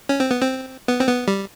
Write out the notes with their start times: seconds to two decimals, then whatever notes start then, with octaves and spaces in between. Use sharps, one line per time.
0.09 C#4
0.20 C4
0.31 B3
0.42 C4
0.88 B3
1.00 C4
1.09 B3
1.28 G3